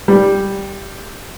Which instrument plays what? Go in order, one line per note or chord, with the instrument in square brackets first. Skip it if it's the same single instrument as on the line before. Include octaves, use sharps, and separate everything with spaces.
[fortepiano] G3